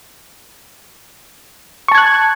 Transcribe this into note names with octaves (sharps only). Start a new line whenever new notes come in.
A5 C#6 F#6 G#6